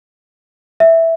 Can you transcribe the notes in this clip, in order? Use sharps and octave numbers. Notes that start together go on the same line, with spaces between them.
E5